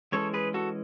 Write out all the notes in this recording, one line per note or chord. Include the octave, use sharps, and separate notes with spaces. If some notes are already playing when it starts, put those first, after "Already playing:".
E3 G#3 C#4 A4 C#5
G#4 B4
F#4 A4